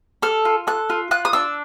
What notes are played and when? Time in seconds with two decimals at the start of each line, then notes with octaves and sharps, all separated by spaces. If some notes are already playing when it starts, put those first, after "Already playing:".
0.22 A4 F6
0.45 F4
0.67 A4 F#6
0.90 F4
1.11 F4 F#6
1.25 D#6
1.33 D4 E6